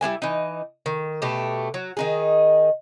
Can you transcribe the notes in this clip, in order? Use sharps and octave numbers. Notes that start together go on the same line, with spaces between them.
G3 D4 E4 G#5
E3 D#4
D#3
B2 A3 G4
F#3
D#3 D#4 G#4